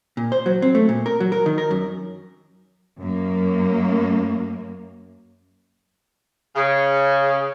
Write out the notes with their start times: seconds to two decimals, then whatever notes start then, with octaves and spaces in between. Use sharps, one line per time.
0.17 A#2
0.32 C5
0.46 F#3
0.62 C4
0.75 A3
0.89 A#2
1.06 A#4
1.20 F#3
1.32 A#4
1.46 D#3
1.58 A#4
1.71 F#2
2.99 F#2 A#3
6.56 C#3